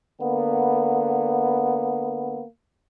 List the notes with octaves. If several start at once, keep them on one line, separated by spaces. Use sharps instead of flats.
D3 A#3 B3